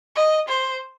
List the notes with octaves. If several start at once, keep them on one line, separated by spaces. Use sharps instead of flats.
D#5
C5